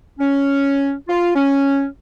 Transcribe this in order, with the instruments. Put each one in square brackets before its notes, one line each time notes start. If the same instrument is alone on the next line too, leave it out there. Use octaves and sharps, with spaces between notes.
[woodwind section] C#4
F4
C#4